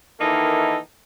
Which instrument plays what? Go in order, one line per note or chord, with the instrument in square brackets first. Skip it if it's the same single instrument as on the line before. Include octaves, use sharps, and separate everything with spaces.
[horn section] D#3 E3 A#3 D#4 E4 A4